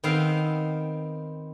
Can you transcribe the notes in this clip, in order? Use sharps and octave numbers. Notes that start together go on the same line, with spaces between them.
D#3 B3 C4 F5 G5 C6